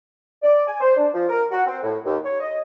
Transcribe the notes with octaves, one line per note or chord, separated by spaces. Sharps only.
D5
G#5
C5
D4
F3
A#4
F#4
C4
A2
D#2
C#5
D#5